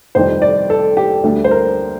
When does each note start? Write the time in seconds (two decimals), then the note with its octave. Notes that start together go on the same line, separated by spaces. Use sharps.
0.15 F1 F2 D#3 G3 C5
0.42 D5
0.70 A4
0.97 G4
1.24 D2 D3 G3
1.44 C5
1.51 A#4